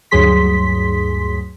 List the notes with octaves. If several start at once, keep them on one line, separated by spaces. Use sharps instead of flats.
D2 G2 F#3 G#4 C6 B6